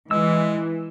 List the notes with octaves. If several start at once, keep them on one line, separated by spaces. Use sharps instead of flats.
E3 G#3 E6